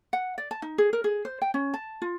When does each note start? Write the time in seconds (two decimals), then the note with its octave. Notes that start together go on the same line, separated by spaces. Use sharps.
0.13 F#5
0.38 D5
0.51 A5
0.62 D#4
0.78 G#4
0.93 A#4
1.04 G#4
1.25 C5
1.42 G5
1.54 C#4
1.74 A5
2.02 F4